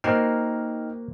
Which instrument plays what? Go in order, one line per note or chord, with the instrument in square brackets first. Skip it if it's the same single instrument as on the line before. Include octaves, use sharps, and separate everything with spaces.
[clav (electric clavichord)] A#3 F#4 C5 [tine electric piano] D#4 G5 F6